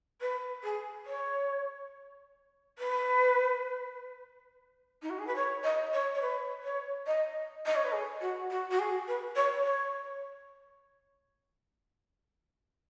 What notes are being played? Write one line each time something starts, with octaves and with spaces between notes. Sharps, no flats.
B4
G#4
C#5
B4
D#4
F#4
G#4
B4
C#5
D#5
C#5
C#5
B4
C#5
D#5
D#5
C#5
B4
G#4
F#4
F#4
F#4
G#4
B4
C#5
C#5